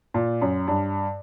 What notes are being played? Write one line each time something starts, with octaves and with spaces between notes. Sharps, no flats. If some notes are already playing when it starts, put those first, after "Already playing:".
A#2
F#2
G2